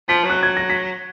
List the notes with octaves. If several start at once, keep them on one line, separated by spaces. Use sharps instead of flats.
F3 B6
F#3
F#6
G#6
A#6
B6